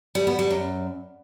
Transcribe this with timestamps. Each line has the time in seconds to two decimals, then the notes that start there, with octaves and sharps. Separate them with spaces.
0.15 G3
0.27 B3
0.39 G3
0.50 F#2